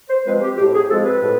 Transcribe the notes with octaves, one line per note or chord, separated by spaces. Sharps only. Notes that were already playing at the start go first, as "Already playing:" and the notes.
C5
F3 G#3 C4 B4
G4
A2 G4
G#4
F3 G#3 C4 A4
B4
A2